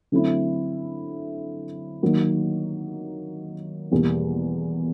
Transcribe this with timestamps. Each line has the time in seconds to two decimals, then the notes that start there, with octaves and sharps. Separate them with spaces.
0.12 D3 F#3 A3 C4 E4
2.03 D#3 F#3 A#3
3.91 E2 B2 G3 A#3